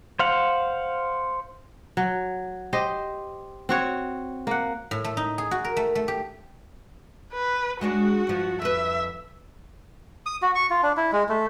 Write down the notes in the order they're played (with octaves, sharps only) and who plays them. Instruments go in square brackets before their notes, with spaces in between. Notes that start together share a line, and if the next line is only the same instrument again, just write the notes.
[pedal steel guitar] C5 F5 F#5
[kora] F#3
G4 C5 D#5
C4 F#4 C#5
A#3 F#5
[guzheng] A2
A3
D#4
G#4
F#4
A#4
A3
A3
G4
[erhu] B4
[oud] G#3 D4 C#5 [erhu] F#4
[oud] G2 F3
[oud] F2 B4 [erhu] E5
[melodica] D#6
F#4
C#6
F4
D4
E4
G#3
A3